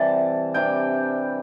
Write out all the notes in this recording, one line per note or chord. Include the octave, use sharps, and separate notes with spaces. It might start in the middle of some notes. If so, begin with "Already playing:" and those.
Already playing: C3 E3 G3 A5
C3 E3 G3 D4 G5